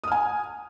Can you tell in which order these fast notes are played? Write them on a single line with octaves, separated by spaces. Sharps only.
D#6 F6 G#5